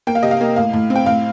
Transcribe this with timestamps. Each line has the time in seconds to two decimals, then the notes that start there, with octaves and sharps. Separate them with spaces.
0.07 A#3 G5
0.15 F5
0.23 C3 D#5
0.31 F5
0.41 A#3
0.56 A2 F5
0.73 A2
0.90 C4
0.96 G5
1.06 A2 F5